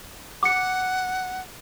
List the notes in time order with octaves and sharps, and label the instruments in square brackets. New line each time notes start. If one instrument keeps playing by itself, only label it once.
[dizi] F#5 [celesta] D6 C#7